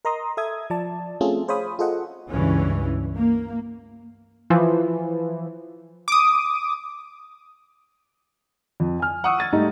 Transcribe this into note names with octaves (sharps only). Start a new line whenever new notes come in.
A#4 D#5 A#5 C6 D#6
A4 E5 D#6 G#6
F3 D5 A5
A3 C4 C#4 F4 G#4 A4
G#4 C5 C#5 F5 B5 D#6
F4 G#4 A4 C5 D#5 F#5
C#2 G2 E3 C#4
A#3
E3 F3
D6 D#6
F2
G#5 F6
F#5 C#6 D#6 E6
G#6 A6 D#7
G#2 G3 A3 D#4